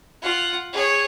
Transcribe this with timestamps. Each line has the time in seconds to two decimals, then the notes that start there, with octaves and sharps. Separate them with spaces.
0.22 F4 F#5
0.73 G#4 C#5